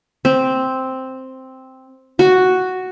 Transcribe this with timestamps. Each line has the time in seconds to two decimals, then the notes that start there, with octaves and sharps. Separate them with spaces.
0.25 C4
2.19 F#4